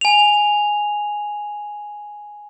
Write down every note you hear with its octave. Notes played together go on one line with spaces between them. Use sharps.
G#5 F7